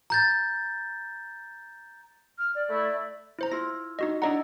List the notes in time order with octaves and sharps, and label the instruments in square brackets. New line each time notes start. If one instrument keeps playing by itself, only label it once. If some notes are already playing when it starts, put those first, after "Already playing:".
[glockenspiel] A#5 G6 A6
[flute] F6
D5
[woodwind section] A3 E4
[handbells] E4 C5 A#5
[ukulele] E4 F4 [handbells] A#6
[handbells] D#4 F#4 D#5
[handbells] D4 D#5 F#5 [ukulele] E4 D5 A#5